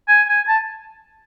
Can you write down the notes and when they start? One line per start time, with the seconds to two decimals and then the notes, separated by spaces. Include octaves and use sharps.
0.08 G#5
0.28 G#5
0.48 A5